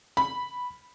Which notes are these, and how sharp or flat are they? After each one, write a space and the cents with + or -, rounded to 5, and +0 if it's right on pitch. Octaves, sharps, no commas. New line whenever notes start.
B5 -5